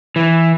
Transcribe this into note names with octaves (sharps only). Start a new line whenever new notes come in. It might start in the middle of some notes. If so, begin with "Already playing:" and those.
E3